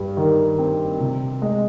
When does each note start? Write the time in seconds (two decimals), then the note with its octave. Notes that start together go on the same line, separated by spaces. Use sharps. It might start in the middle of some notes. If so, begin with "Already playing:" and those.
Already playing: G2 G3
0.17 D#3
0.59 C4
1.00 C3
1.42 G#3